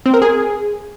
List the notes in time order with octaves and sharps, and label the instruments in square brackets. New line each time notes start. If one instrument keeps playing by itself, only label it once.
[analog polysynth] C4
A#4
G#4